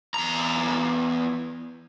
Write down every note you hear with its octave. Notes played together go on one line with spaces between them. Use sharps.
E2 A#5